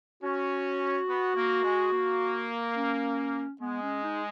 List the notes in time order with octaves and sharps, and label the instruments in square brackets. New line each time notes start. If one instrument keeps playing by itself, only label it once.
[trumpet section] C#4 [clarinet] F#4
[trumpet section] B3
A#3
G#3
A#3
[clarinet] C#4
[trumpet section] G#3 [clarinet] B3
[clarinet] C#4
D#4